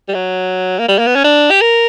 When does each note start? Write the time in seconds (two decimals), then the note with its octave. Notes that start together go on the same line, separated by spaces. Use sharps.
0.08 G3
0.15 F#3
0.79 A#3
0.88 G3
0.98 A#3
1.07 B3
1.16 C#4
1.24 D4
1.51 G4
1.61 A#4